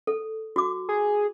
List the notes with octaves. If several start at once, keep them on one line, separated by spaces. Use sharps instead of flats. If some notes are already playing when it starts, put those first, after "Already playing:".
A4
F#4 D6
G#4